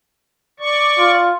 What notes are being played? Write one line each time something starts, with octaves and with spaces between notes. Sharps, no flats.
D5 C#6
F4